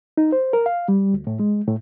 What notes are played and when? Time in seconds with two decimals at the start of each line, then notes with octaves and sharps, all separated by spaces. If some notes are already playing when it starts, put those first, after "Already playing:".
0.17 D#4
0.32 C5
0.53 A#4
0.66 F5
0.88 G3
1.14 D2
1.27 A2
1.39 G#3
1.68 A2